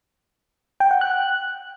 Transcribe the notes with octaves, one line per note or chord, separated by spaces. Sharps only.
G5
F#5
F#6